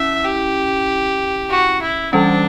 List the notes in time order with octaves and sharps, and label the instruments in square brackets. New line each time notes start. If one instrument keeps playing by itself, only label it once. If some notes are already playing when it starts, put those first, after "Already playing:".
Already playing: [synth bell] C#4 E4 [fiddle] E5
[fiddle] G4
F#4
E4
[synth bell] E3 G3 C#4 [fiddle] D4